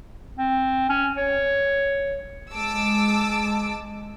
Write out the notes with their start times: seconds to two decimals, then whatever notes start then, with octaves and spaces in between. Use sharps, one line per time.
0.38 C4
0.90 C#4
1.17 C#5
2.53 G#3 A5 D6 E6